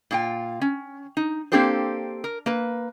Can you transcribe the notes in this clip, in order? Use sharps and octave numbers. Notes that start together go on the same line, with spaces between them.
A#2 F4 G5
C#4
D#4
A#3 C4 D4 G4 A4 C5
A#4
A#3 B4